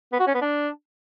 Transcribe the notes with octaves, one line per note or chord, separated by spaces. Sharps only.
B3
F#4
C#4
B3
D4